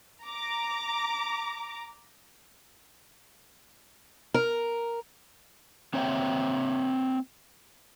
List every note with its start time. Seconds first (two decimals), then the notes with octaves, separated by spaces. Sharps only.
0.23 A#5 D6
4.34 A#4
5.94 A#3 C4 C#5 E5 F#5 G5